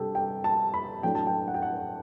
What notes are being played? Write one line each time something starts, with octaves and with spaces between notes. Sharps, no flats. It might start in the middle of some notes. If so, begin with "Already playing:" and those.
Already playing: C3 G3 D4 G4 A4
G5
A5
B5
A2 F#3 A3 D4 G5
A5
G5
F#5
G5
F#5